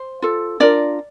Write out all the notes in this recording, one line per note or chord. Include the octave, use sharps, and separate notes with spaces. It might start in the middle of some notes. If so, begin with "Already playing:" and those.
Already playing: C5
F4 A4
D4 F4 A#4 D5